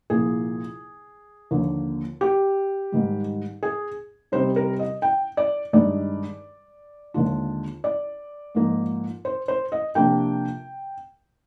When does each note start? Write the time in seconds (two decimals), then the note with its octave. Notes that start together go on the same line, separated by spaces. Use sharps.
0.10 C2 A#2 F3 A#3 G#4
1.51 D#2 D3 F3 A#3
2.21 G4
2.92 G#2 D#3 G3
3.63 G#4
4.32 C3 G3 C4 D#4 C5
4.56 A#4
4.79 D#5
5.02 G5
5.37 D5
5.73 G2 D#3 G#3 D#4 D5
7.14 D#2 D3 G#3 D4 F4
7.84 D5
8.55 G#2 F3 A#3 D#4
9.25 C5
9.48 C5
9.72 D#5
9.95 C3 F3 A#3 D4 G5